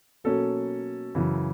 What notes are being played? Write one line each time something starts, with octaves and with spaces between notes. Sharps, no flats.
B2 F#3 A#3 C#4 A4
F#2 C#3 E3